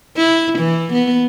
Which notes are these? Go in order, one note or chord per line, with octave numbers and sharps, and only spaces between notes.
E4
E3
B3